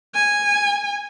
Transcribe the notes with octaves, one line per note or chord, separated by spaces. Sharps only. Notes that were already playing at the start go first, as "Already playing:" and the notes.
G#5